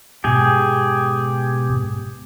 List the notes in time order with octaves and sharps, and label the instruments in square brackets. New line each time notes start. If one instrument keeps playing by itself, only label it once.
[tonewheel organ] G#2 B2 [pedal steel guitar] G4 G#4